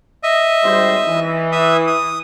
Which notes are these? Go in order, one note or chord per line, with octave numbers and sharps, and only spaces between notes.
D#5 E5
G#1 G3 C5
E3
E5 D#6
D#6